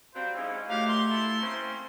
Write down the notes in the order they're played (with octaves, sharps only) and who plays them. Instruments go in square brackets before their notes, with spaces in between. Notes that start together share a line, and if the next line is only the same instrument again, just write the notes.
[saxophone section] F#3 G3 C4 [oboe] C5 [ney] F5
[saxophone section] G#2 C#4 [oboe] E4
[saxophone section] A#2 D#3 F#3 [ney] A3 [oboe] G4 [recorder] F5
[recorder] C6
[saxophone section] E4 [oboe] A4
[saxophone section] A#3 C4 [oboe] C#4